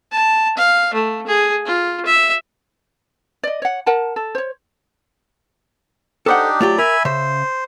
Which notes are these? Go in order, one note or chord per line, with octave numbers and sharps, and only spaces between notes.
A5
F5
A3
G#4
F4
E5
D5 D#5
C#5 F#5
A#4 F#5 A5
A4
C5 C#5
D4 D#4 G4 A4 C5 F#5
F#3 A3 F4 G4 D5
A#4 E5 G#5 B5
C#3 C5 E5